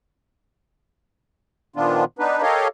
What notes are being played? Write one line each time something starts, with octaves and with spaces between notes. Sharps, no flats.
A#2 D#3 F3 B3 D4 F4
B3 D4 D#4 B4
G4 A4 A#4 C#5 D#5 F5